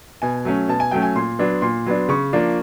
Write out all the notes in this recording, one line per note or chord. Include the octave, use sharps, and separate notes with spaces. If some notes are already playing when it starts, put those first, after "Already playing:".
B2 G#5
F#3 A3 C#4
B2 A5
G#5
F#3 A3 C#4 G5
G#5
A#2 C6
F#3 B3 D4
A#2 C6
F#3 B3 D4
C#3 C#6
F3 A#3 D4